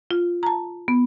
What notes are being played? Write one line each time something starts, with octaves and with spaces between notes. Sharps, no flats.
F4
A5 A#5
B3